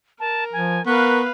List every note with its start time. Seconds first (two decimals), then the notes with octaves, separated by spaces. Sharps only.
0.20 A#4 A5
0.53 F3 G#5
0.86 B3 A#4 B4 F5 C#6